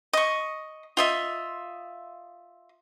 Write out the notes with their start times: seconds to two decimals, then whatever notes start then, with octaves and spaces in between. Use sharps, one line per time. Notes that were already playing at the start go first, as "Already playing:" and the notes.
0.13 D#5 C#6
0.97 F4 D#5 E5